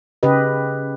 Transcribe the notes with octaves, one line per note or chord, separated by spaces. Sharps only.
C#3 G4 B4 D#5